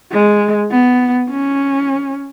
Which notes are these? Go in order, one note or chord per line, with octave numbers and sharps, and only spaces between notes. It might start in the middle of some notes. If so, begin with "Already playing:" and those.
G#3
B3
C#4